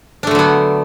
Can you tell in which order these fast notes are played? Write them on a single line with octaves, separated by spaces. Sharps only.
D4 A3 D3 F#3 B3